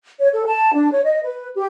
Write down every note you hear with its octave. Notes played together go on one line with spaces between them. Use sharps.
C#5
A4
A5
D4
C#5
D#5
B4
G4